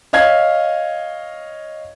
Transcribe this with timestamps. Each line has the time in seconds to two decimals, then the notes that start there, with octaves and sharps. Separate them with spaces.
0.13 C#5 D#5 F5 G#6